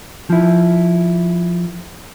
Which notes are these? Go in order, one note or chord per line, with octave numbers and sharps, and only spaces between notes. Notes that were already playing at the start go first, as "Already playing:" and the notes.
F3 E4